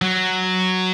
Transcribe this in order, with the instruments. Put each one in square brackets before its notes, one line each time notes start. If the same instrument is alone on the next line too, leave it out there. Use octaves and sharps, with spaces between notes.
[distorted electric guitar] F#3